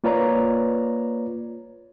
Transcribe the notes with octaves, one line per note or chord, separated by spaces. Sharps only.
A#3 F4 B4 C#5 D5 A#5